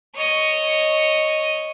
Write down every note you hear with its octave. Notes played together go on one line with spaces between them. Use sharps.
C#5 D#5